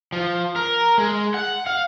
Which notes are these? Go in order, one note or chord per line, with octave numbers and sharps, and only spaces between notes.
F3
A#4
G#3
F#5
F5